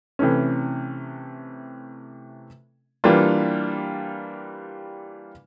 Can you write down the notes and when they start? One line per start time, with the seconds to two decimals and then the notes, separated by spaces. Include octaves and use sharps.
0.19 C3 E3 A3 C#4
3.04 E3 G3 A#3 D4 F4